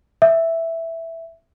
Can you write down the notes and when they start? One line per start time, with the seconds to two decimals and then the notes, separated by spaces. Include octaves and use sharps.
0.22 E5